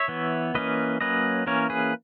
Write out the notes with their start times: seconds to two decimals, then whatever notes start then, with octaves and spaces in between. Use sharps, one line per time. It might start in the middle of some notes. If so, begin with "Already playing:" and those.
Already playing: C#5 E5
0.08 E3 B3
0.55 E3 A#3 C#4 B4 D#5
1.01 F#3 A#3 C#4 B4 D#5
1.47 E3 A#3 C#4 A#4 C#5
1.70 G#4 B4